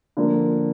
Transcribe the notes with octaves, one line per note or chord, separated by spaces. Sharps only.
D3 F3 A#3